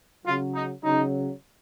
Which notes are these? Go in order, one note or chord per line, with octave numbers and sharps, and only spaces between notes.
C#3 F#3 F4
D#4
C#3 F#3 D#4